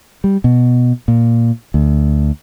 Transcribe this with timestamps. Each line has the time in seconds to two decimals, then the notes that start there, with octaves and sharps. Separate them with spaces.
0.24 G3
0.44 B2
1.08 A#2
1.74 D2